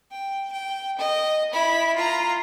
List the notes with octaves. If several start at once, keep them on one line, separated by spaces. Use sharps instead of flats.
G5
G5
D#5
E4 B5
F4 A#5